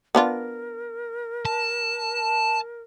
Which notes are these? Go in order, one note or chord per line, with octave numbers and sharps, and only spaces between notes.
B3 D4 F4 A#4
A5